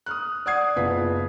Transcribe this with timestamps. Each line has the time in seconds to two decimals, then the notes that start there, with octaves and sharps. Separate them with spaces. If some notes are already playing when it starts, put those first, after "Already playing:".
0.06 D#6 F6 F#6
0.46 D5 F#5 D#6 G#6 C7
0.76 F#1 B3 F4 B6